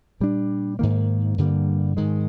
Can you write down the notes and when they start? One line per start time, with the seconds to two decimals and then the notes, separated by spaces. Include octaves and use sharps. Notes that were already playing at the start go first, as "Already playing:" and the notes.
0.20 A#2 G3 D4
0.79 G#2 D#3 A#3
1.38 G2 D3 G3 A#3
1.97 G#2 D#3 G#3